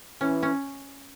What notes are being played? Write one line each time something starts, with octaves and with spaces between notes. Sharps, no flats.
E3 C#4
C#4